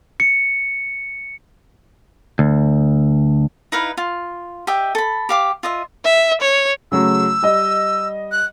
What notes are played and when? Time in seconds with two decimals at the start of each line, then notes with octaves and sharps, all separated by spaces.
0.20 C#7
2.39 D2
3.72 D#4 E4 B4 F5
3.97 F4
4.67 G4 D#5 E5 G5
4.95 A4 B5
5.29 G4 F5 D6
5.63 F4 D#5 E5
6.05 E5
6.41 C#5
6.92 C#3 F#3 A3 E6
7.42 G3 D#5
8.31 F#6